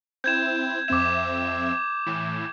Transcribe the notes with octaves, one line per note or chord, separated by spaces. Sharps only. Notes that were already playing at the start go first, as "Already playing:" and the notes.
C4 E4 G6 G#6 E7
F2 C4 E5 D6 E7
A2 E3